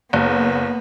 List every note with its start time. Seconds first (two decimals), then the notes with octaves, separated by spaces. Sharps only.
0.13 F#1 A#3 B3